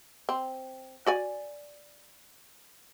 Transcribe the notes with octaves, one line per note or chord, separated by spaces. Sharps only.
C4
F#4 D5 G#5